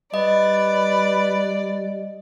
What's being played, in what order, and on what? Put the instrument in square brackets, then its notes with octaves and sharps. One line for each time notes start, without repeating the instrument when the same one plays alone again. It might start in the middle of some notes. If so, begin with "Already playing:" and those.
[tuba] G3 [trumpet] B4 [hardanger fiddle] D5 [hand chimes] D#5